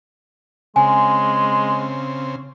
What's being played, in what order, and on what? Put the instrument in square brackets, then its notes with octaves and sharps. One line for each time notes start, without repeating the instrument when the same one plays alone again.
[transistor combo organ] C#3 C4 [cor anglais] G#3 [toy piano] G#5